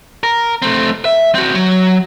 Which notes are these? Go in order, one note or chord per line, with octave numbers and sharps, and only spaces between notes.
A#4
A3 C4
E5
C4 F#4
F#3